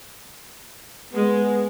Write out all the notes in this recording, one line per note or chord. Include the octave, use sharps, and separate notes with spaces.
G#3 B3